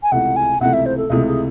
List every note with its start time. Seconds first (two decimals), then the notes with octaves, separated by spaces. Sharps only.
0.03 G#5
0.12 C#2 C3 E3 A3 F#5
0.36 G#5
0.61 C#2 C3 E3 A3 F#5
0.73 E5
0.86 C5
0.98 A4
1.10 C#2 C3 E3 A3 G#4
1.27 G#4